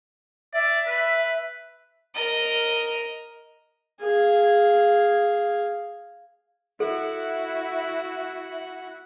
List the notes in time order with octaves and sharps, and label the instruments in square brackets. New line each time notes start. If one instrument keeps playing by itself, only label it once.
[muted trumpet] D5 [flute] E5
[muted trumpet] B4
[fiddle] A#4 D#5
[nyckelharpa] G#4 F5
[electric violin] E4 F#4 [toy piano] A4 [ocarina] E5 [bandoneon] F#5 F#6